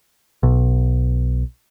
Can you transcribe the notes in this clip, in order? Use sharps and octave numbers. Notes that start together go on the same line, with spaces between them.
B1